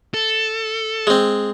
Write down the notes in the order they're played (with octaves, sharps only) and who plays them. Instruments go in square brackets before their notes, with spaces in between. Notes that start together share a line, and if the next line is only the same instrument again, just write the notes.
[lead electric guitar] A4
[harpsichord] G#3 C4